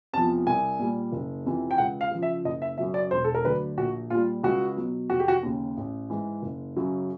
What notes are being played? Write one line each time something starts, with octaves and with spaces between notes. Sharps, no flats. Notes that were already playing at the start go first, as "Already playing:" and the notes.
E2 C3 F3 A5
C2 G#5
A#2 G3
F#1
F2 C3 E3
G5
C#2 F#5
F5
C#3 F3
E5
F#1 D#5
E5
F#2 C#3 F#3 E5
D5
E1 C5
A4
A#4
D2 D3 F#3 B4
A#1 F#4
A#2 G3 F4
C#2 F#4
B2 F#3
F1 F#4
G4
F#4
D#2 C#3
A1
G#2 E3
F#1
F#2 C#3 F#3